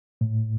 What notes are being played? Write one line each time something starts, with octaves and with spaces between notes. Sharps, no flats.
A2